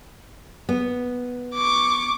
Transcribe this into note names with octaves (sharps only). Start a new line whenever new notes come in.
B3
C#6 D6